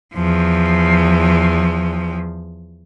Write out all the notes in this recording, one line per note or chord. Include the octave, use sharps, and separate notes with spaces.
E2 F3